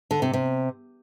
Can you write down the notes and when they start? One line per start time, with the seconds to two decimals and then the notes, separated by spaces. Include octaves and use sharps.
0.11 D3
0.22 C3
0.33 C3